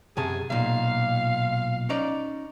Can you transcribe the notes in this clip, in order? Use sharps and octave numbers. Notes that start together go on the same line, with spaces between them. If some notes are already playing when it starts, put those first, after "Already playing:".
F#2 C3 G#4 A5
B1 A#2 F5
C#4 D#4 D5